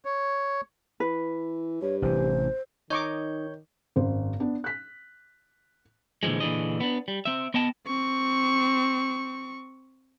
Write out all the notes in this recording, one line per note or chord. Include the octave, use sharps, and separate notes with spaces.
C#5
E3 B4
G2 C#5
A1 C3 E3 C5
D#3 D#4 C#5 D#5 C#6 D6 G6
G#1 F#2 C5
B3 D4
F#6 B6
A#2 D3 E3 F3 G#3
A#2 D3 E3 D4 G#4 D#5
B3 D4
G3
C4 E5
B3 D#5 G5 A5
C4 C#6